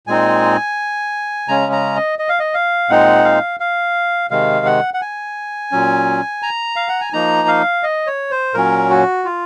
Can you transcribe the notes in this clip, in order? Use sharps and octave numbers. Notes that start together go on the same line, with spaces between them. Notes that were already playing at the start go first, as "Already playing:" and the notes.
A#2 G#3 C4 D#4 G#5
C#3 G#3 C#4 A#5
A#5
D#5
D#5
F5
D#5
F5
A#2 G#3 C4 D#4 F#5
F5
F5
C3 D#3 G#3 F5
F#5
F#5
G#5
A#2 F#3 C#4
A#5
F5
F#5
G#5
F3 A#3 D#4 A#5
F5
D#5
C#5
C5
A#2 F#3 C#4 A#4
F#4
F4